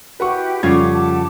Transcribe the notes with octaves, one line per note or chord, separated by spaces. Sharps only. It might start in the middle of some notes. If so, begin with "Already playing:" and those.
E4 F#4 G4 B4 F#5 C#6
F2 C#3 G3 F4 F#5 C#6 D6 G#6
F#5 A5 D6